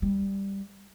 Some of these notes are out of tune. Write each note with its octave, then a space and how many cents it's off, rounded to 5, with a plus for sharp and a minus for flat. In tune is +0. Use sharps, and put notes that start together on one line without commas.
G3 +5